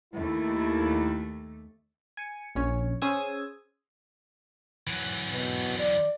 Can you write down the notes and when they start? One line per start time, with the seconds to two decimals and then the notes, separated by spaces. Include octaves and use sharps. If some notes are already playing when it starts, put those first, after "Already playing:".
0.14 D#2 A3 E4
2.17 G#5 C#7
2.55 A#1 C#4 C#5
3.02 C#4 G#4 C5 D#6 E6 G#6
4.87 E3 F#3
5.32 B2
5.79 D5